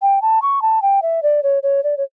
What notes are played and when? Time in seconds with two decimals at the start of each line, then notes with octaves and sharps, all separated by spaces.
0.02 G5
0.22 A5
0.42 C#6
0.62 A5
0.82 G5
1.02 E5
1.23 D5
1.43 C#5
1.63 C#5
1.83 D5
1.97 C#5